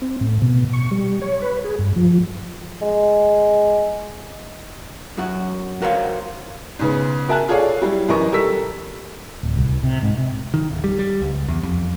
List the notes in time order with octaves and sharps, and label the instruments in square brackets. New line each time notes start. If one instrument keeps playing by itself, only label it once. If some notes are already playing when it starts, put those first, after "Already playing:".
[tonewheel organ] C4
A2
B2
C#6
G3
C#5
B4
G#4
G2
F3
[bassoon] G#3
[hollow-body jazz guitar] F#2 F#3 F#4
F#4 A#4 C5 C#5 E5 F5
[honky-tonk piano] G#2 C#3 B3
F#4 A#4 E5 G#5 A5 F#6
F4 G#4 A4 C#5 D5 F5
F#3 G3 E4
F#2 E3 D#4 A#4 D#5 C#6
G3 A4 A#4 E6 B6
[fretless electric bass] D1
C2
C3
G#2
C3
[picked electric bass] D#3
D1
G3
G3
C#2
E2
F2